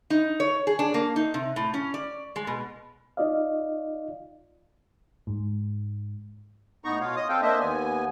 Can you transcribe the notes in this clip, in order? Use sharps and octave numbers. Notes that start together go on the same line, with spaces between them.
D#4
C#5
G#4
D4
A#3
D#4
C3
A2
C#4
D5
G#3
B2
D#4 F4 D5 D#5 F5
G#2
A2 B3 D#4 A#5 C#6
B2 F4 C#5 F5
D#5 D#6
C4 A4 F5 G5
A#3 D4 C5 D#5 E5
D#2 B3 G#5